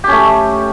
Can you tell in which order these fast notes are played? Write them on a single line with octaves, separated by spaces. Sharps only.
G4 C#4 A3